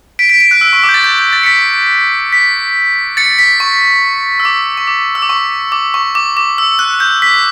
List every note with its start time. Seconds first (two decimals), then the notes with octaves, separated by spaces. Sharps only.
0.19 B6 D7
0.29 B6 D7
0.40 B6 D7
0.51 F#6
0.61 E6
0.73 C#6
0.83 D6
0.89 G6
0.94 A6
1.04 G6
1.18 G6
1.33 A6
1.43 C#7
1.46 B6
2.33 B6
3.17 A6 C#7
3.39 B6
3.60 C#6
4.40 E6
4.45 D6
4.77 C#6
4.87 D6
5.15 E6
5.22 D6
5.29 C#6
5.72 D6
5.94 C#6
6.15 D6
6.37 D6
6.58 E6
6.79 F#6
7.00 G6
7.22 B6